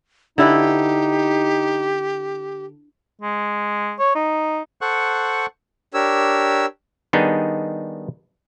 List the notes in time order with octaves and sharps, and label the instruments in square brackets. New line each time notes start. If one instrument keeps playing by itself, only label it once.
[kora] D3 E4 B4 [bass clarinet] D#4 [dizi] G4
[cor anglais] G#3
C#5
D#4
[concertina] A4 C5 F#5 C#6 F#6
[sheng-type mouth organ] D4 G4 A#4 C#5 E6
[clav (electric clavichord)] D#3 G3 B3 D4 D#4 G#4